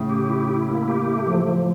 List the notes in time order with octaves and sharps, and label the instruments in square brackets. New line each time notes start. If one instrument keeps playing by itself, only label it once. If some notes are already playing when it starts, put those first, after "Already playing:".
Already playing: [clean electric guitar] A2 C#3
[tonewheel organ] G4
E4
E4
A#3
G4
A3
F3
F3